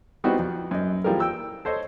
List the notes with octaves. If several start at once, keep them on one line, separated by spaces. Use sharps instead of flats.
G3 B3 C4 D#4 E4 F#4
F2
F#2 D#5
E3 F3 G3 G#4 A#4
G5 E6
A4 C5 C#5 D#5